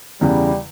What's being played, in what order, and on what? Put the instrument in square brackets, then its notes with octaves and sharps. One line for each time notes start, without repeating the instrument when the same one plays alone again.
[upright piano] E2 C#3 E3 [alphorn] G3